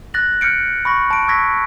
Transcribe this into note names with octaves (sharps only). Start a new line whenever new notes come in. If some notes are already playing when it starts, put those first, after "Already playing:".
F#6 A6 A#6 F#7
F6 G6 C#7 D7
B5 C#6 A#6
A5 D7
C#6 E6 G#6 A#6 B6